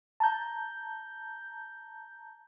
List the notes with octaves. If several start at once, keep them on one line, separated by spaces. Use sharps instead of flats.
A5 A#5 G6